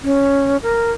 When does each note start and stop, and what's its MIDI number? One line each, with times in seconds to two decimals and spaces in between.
0.03 0.57 61
0.63 0.91 70